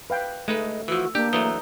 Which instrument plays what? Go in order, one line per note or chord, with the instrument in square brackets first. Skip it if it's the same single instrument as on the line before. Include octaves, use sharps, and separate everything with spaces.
[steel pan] B4 F5 G5
[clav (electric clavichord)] G#3 D#4 B4 [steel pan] A3
[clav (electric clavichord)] E3 F3 [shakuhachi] F#4 [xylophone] E6
[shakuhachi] A#3 [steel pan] D4 [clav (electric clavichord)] G4 [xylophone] G6
[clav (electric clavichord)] E3 F#3 A3 [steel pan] B4 [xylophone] A#5 D#6 G7